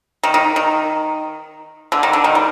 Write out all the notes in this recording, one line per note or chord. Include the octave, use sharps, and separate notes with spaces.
D#3
D#3
D#3
D3
D#3
D3
D#3
G3